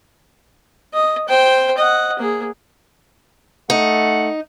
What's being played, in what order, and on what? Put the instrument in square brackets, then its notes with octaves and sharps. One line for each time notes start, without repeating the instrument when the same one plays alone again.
[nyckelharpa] D#5
C5 G5
D#5 F#5
A#3 G#4
[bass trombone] A3 [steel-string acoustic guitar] D#4 [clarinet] F#5